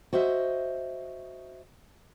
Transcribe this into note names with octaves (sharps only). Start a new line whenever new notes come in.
F#4 C5 D#5 E5